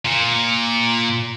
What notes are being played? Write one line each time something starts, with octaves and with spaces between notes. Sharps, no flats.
A#2